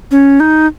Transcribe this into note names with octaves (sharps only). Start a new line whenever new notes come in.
C#4
D#4